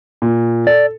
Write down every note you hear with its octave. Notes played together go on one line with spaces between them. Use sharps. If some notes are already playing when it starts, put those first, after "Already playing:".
A#2
A4 D5